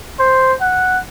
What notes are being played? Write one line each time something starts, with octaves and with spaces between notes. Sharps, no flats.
C5
F#5